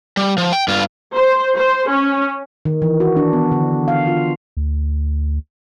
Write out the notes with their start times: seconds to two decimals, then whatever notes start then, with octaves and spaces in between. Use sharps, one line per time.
0.17 G3
0.38 F3
0.53 G5
0.68 G2 F4
1.15 C5
1.55 C5
1.88 C#4
2.65 D#3
2.82 E3
3.00 F#4
3.17 D4
3.33 B3
3.52 D3
3.88 F5
4.08 F4
4.57 D2